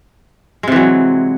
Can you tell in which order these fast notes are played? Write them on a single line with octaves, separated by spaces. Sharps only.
G#3 C3 E3 F#3